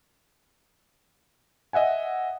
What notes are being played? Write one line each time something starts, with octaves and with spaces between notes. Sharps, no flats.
D#5 E5 F#5 G#5